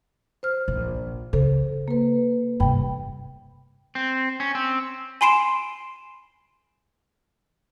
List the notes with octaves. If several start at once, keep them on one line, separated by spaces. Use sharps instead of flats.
C5 F6
A#1
C#3 A4 C5
A#3 B4
G2 C3 G5 B5
C4
C#4
C4
G#5 B5 C6 C7 D7 E7